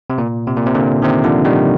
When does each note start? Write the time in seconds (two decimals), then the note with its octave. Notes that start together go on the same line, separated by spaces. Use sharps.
0.10 C3
0.18 A#2
0.47 C3
0.57 A#2
0.66 C3
0.75 A#2 D3
1.02 C3 D#3
1.24 D3 F3
1.45 D#3 G3